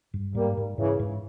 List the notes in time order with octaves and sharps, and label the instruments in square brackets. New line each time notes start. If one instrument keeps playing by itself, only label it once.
[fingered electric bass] G2
[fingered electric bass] G#2 [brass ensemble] G3 A#3
[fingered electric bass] G#2
[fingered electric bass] G#2 [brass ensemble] C#3 E3
[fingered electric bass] G#2